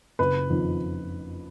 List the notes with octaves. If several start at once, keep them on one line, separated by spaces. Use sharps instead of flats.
F#1 B4
F2 D#3